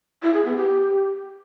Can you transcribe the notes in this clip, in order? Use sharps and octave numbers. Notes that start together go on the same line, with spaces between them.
E4
G#4
B3
G4